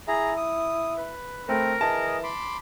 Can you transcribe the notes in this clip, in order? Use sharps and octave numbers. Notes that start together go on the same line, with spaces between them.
E4 G#4 A#5
D#6
B4
A3 C4 A#4
E3 G#4 D#5 A5
B5 C6 D6